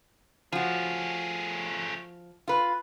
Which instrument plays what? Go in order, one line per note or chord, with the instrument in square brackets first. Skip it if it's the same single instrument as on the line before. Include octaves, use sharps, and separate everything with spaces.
[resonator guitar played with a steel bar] F3 F#4 [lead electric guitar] A3 G#4
[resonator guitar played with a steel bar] F4 B4